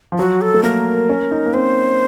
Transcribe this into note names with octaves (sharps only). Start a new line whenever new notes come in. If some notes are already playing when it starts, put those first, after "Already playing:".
F3
F#3 F#4
A4
A3
A#3 A#4
C#4
D#4
A#3
C4 C5